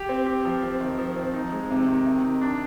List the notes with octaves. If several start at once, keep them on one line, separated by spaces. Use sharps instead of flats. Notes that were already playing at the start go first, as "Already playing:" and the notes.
Already playing: G4
C4
G4
F3
C4
D#3
F3
C4
D#4
G#3
C3
D#3
C3
D#3
D4